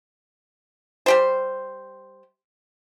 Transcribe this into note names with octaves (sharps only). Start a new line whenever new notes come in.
G3 G4 C5